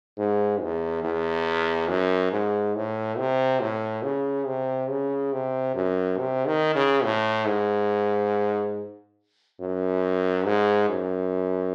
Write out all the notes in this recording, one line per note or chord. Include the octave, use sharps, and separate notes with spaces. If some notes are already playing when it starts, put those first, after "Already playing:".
G#2
E2
E2
F#2
G#2
A2
C3
A2
C#3
C3
C#3
C3
F#2
C3
D#3
C#3
A2
G#2
F#2
G#2
F#2